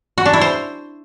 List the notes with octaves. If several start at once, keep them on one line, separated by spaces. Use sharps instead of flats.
F#4
D4
E4
C5